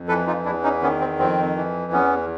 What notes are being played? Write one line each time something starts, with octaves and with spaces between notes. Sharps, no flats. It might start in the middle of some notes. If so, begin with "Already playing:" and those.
Already playing: F2
E3 A4 B4
D#4 F4
E2 D4 E4
C#4 D#4
D#3 B3 C#4
C4
F2 C4
E3
E2 B3 C#4